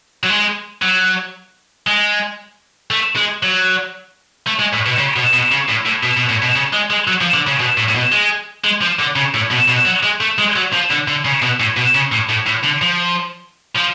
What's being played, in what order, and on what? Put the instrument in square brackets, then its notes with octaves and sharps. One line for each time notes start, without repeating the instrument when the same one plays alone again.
[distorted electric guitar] F#3
G#3
F#3
G#3
A3
G#3
F#3
A3
G#3
A2
B2
C#3
B2
B2
C#3
A2
A2
B2
B2
A2
B2
C#3
G#3
G#3
F#3
F3
D3
C#3
B2
A2
A2
B2
G#3
G#3
F3
D3
C#3
A2
B2
B2
F#3
G#3
A3
G#3
F#3
F3
D3
D3
C#3
B2
A2
B2
C#3
A2
A2
A2
D3
F3
F3